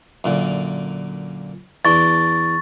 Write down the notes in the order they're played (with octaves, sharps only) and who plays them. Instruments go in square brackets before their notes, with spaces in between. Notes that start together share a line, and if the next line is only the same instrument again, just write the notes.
[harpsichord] F#2 A#2 D3
[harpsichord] E2 D4 A5 [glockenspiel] C#6 A6